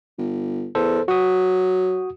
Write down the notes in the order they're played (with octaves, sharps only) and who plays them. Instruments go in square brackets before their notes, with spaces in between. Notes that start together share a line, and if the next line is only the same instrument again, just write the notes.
[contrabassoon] G1
[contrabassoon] E2 [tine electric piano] A4 C5
[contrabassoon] F#3 [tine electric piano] F#4 D#6